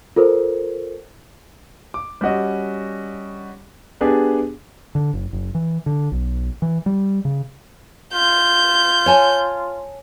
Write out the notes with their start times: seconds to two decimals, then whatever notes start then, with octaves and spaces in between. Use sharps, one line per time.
0.16 F4 A4 A#4 C5
1.94 D6
2.21 G3 C#4 F#4 D#5
4.01 B3 D4 G4 G#4
4.95 D3
5.13 F#1
5.33 F#1
5.55 E3
5.86 D3
6.12 B1
6.62 E3
6.86 G3
7.25 C#3
8.14 F4 G6
9.06 C#5 G#5 A5